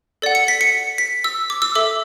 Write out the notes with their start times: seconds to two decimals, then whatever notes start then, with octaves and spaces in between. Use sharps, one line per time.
0.22 A4 D5 F#5
0.35 C#7
0.48 B6
0.61 C#7
0.98 B6
1.24 E6
1.50 D6
1.62 E6
1.75 A4 E5 D6